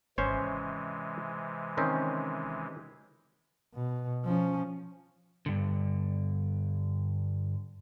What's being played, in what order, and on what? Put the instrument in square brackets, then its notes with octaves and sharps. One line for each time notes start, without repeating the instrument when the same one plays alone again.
[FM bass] G#1 [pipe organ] C3 E3 G#3 [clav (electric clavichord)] C#4 C5 C#5
[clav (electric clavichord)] D#3 C4 C#4
[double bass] B2
F3 C#4
[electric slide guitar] G2 D3